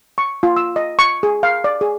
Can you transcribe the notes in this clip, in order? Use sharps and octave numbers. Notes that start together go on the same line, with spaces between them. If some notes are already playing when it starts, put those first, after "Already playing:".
C#6
F4
E6
D#5
C#6
G#4
F5
D5
G#4